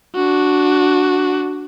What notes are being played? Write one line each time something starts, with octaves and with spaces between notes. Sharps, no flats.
D4 F#4